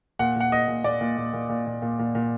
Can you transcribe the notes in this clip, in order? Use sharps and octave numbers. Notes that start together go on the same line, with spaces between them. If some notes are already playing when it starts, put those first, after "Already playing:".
A#2 F#5
A#2 F#5
A#2 D#5
A#2
A#2 D5
A#2
A#2
A#2
A#2
A#2
A#2
A#2
A#2